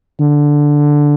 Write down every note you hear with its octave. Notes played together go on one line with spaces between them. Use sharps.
D3